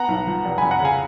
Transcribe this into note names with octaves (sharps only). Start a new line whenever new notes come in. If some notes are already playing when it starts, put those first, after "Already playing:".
Already playing: B3 F#5 A#5
B1
F3
F1
G#5 B5
F1
F#5 A#5
C#3 F5 G#5